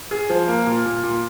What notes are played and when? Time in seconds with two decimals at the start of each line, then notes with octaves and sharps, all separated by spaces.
0.11 G#4
0.30 F3
0.48 A#3
0.66 A#2
0.86 A#2
1.03 A#2